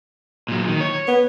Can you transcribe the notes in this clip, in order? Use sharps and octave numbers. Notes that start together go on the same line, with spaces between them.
A#2 F#3
D#3
C#5
B3